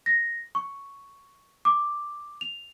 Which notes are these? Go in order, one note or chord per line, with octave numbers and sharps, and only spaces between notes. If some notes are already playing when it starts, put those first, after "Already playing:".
A#6
C#6
D6
F7